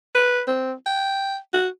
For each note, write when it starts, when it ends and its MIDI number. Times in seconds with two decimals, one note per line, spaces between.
0.15 0.42 71
0.48 0.73 60
0.86 1.38 79
1.53 1.68 66